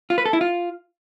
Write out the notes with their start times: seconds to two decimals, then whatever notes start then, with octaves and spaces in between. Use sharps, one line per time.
0.10 F4
0.18 B4
0.26 A4
0.33 E4
0.41 F4